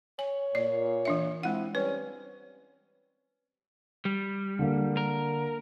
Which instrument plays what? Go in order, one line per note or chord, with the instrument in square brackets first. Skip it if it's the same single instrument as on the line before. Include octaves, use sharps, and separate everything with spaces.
[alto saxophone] C#5 [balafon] G#5
[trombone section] A#2 [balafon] D5
[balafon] E3 D4 E5
[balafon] G#3 F#5 [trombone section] C4 E4 F4
[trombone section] G3 C4 [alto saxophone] C#4 [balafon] B4
[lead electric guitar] G3
[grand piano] D3 A#3
[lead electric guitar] A#4